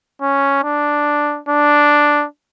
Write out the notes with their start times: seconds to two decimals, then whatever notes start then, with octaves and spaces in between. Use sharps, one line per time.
0.22 C#4
0.64 D4
1.49 D4